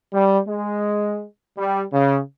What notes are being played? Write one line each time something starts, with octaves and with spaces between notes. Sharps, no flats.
G3
G#3
G3
C#3